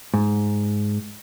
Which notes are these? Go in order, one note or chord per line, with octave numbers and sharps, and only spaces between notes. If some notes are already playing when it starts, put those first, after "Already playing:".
G#2